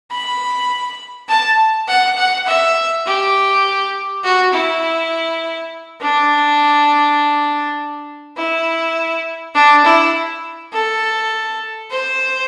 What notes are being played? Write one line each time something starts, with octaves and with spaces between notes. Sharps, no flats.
B5
A5
F#5
F#5
E5
G4
F#4
E4
D4
E4
D4
E4
A4
C5